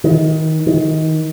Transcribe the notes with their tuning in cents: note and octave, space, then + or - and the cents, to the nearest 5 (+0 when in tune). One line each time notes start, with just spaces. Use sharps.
D#3 +25
D#3 +25